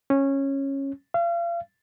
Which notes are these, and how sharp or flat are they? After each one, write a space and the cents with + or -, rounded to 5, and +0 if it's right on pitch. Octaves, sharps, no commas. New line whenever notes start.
C#4 -15
F5 -35